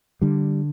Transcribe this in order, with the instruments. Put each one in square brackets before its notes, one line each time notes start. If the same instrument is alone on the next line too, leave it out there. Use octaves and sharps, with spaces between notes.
[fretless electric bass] D3 G3